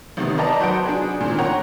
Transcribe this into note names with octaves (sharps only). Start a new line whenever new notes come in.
A1 C3 D#3 B3
A#4 B4 D5 D#5 A5 A#5
F#3 C5 F#5 G6 D7
D4 F#4 G#4
A#2 D#3 C4
A#4 C#5 F#5 G5 A#5